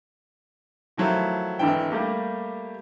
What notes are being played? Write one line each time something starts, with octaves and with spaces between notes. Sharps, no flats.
D#3 F3 F#3 A3 E4
G#1 D3 E3 D4 G5
G3 A3 A#3 G4